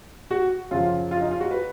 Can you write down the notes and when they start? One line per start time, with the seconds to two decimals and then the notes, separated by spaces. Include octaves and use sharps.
0.31 F#4
0.71 F#2 C#3 F3 F4
1.11 F4
1.21 D#4
1.31 F4
1.40 F#4
1.51 B4